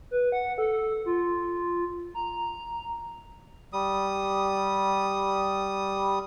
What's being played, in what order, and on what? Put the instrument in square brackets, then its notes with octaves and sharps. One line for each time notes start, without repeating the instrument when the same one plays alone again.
[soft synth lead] B4
F#5
A4
F4
A#5
[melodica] G3 D#6